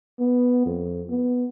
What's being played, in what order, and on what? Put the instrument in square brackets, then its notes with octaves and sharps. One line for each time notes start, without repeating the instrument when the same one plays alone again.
[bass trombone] B3
F2
B3